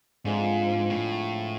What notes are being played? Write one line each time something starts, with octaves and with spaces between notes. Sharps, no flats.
G#2 D3 F3 G#3 C4
A2